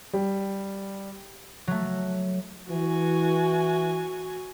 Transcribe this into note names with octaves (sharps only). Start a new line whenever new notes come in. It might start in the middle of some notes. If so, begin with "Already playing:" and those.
G3
F#3 A3
E3 F#4 G#5